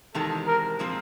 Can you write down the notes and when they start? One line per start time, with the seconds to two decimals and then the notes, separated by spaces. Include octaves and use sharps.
0.14 E2 C3 D#3 G#3 C4 A4
0.47 A#4
0.79 A#2 F3 G#3 C4